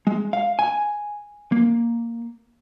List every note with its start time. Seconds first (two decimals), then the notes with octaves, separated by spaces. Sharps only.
0.07 G#3
0.33 F5
0.59 G#5
1.52 A#3